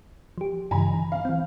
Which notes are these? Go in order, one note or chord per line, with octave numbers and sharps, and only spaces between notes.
F3 G4
G2 C#3 E3 G#5 A#5 B5
D3
F5
E3 C4